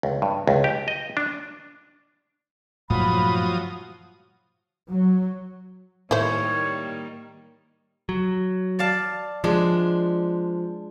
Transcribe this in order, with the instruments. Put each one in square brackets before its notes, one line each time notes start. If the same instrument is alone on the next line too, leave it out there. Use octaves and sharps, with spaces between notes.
[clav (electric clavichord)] C#2
G2
C#2
G4
D#5
D4
[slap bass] G2 A#2 A3 [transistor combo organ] F3 F#3 D#6 [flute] B5
[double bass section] F#3
[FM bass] A2 [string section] D#3 G3 A#3 [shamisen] E4 C5 [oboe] C#5
[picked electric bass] F#3
[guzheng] D5 F5 A5
[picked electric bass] F3 [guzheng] G#3 D4